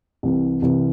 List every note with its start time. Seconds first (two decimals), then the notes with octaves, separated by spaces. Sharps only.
0.23 C2 C3 E3
0.62 C2 C3 E3